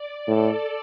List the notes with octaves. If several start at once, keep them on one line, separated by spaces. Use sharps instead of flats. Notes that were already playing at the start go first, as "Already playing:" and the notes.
Already playing: D5
A2 A4